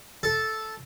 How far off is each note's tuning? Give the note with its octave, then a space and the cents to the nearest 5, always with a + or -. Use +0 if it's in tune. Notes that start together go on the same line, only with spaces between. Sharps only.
A4 -5